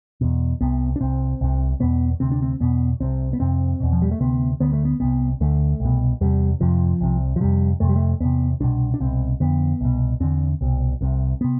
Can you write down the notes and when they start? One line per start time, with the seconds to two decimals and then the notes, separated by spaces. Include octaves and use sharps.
0.21 E2 B2
0.61 C2 C3 B3
0.96 D4
1.01 C2 C3 C4
1.41 C2 C3
1.80 E2 B2 B3
2.20 D2 C3 C4
2.32 D4
2.42 C4
2.60 E2 B2 B3
3.00 C2 C3 C4
3.33 B3
3.40 F2 C3 C4
3.80 E2 B2
3.93 F3
4.02 G3
4.11 A3
4.20 D2 C3 B3
4.60 D2 D3 B3
4.73 A3
4.85 B3
5.00 C2 C3 B3
5.41 D2 D3 A3
5.80 C2 B2
6.21 E2 C3 G3
6.60 F2 C3 F3
7.01 C2 C3
7.36 F3
7.40 F2 C3 G3
7.80 F2 C3 A3
7.89 G3
7.96 A3
8.20 E2 C3 B3
8.60 C2 B2 D4
8.94 D4
9.00 C2 B2 C4
9.40 F2 D3 B3
9.81 C2 B2
10.20 E2 D3 C4
10.61 C2 B2
11.01 C2 C3
11.41 C3 B3